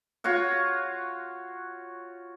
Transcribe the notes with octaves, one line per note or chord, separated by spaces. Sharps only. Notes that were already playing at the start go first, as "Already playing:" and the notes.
F4 F#4 C#5 F#5